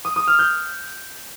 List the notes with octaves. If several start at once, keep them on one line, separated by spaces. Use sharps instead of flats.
D#6
D#6
F6
G6